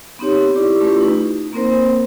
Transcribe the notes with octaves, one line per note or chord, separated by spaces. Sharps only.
B3 C4 D#4 G4 C#5
E4 G4 D5 D6
A3 C#4 E4 F4 G4 B4
D#4
A#3 C4 A#4 C5